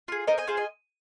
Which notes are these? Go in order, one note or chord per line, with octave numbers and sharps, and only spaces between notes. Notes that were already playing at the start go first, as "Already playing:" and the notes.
F4 G#4
C4 A#4 D#5
D#5 G#5
F4 G#4 C5 F5
D#5 G#5